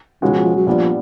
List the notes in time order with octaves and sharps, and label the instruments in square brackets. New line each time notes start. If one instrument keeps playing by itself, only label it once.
[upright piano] C#2 B2 G#3 C#4 F#4 [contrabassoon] D#3
[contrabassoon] F3
F3
F#3
[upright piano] A#2 G3 B3 D4 [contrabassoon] F3